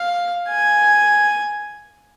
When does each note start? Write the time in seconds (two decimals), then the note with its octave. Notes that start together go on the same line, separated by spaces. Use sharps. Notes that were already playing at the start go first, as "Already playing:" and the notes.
Already playing: F5
0.49 G#5